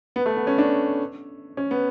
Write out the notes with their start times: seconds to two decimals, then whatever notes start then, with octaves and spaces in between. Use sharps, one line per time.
0.16 B3
0.26 A3
0.36 B3
0.47 C#4
0.58 D4
1.57 C#4
1.71 B3